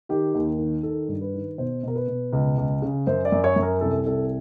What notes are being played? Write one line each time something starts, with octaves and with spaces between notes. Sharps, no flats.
D#3 G4
D#2
D#3
D#3 A4
G2
B4
D#3
B2 C5
B2 A#4
B4
B2
C#2
C#2
C#3
F#2 C5
D5
F#2
C#5
F#2
A#4
C2 A4
C2 A4